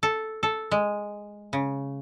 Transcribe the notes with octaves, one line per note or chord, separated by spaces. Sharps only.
A4
A4
G#3
C#3